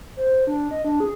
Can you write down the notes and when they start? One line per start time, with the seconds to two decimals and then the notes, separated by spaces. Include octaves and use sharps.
0.17 C5
0.47 D4
0.71 D#5
0.84 D4
1.00 G#4